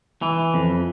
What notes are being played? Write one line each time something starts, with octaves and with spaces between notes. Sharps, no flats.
E3
F2